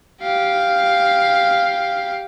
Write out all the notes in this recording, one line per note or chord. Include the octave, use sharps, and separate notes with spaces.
G4 F5